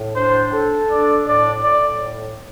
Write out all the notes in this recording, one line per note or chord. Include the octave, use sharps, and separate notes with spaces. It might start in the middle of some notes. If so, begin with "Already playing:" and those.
Already playing: A2
D4 C5
A4
D4 D5
A2 D5
A2 D5